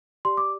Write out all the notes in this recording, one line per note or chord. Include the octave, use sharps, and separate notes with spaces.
G4 D5 C6
D6